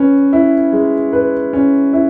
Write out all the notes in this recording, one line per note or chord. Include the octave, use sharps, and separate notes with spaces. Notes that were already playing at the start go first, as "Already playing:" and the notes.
Already playing: C#4 B4
E4
G#3
B4
C#4
E4